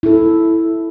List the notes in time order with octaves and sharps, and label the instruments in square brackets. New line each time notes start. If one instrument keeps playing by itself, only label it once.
[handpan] E4 A4